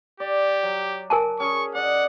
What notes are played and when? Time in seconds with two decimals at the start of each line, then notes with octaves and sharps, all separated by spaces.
0.20 G4 D5
0.63 F#3
1.10 A#4 G#5 A5
1.40 C#4 G#4 C#6
1.75 D5 D#5 F#5